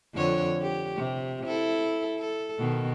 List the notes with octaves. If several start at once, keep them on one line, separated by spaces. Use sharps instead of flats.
F2 D3 C#5
G4
C3
E4 A4
A4
B2 D#3